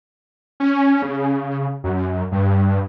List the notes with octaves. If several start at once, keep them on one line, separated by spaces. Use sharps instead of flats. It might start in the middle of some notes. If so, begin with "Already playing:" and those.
C#4
C#3
F#2
G2